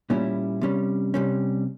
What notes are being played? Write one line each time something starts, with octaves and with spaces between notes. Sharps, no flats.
A#2 G3 C#4 E4
C3 G3 C#4
C3 G3 C#4